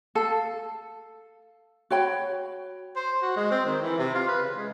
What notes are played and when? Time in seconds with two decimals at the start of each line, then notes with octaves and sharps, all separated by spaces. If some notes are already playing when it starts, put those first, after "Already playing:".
0.15 A4 F5
1.90 F#4 C#5 G5 B5
2.96 C5
3.22 F#4
3.36 G#3
3.51 C4
3.66 D#3
3.82 E3
3.98 C3
4.15 F4
4.28 B4
4.42 C#3
4.56 G#3